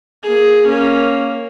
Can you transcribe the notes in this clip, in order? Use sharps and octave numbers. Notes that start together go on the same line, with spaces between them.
A#3 G#4
A#3 C#4